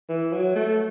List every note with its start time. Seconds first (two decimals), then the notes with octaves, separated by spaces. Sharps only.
0.09 E3
0.33 F#3
0.55 A3